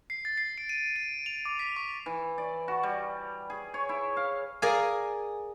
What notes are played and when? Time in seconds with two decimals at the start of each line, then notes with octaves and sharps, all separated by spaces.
0.10 C7
0.25 A6
0.37 C7
0.58 D7
0.69 D#7
0.96 D7
1.26 F7
1.45 D6
1.59 B6
1.76 C#6
2.06 E3
2.38 D5
2.68 F#4
2.83 G3
3.50 G#4
3.74 C#5
3.89 E4
4.17 F5
4.62 G#4 A#4 D5 F5 G#5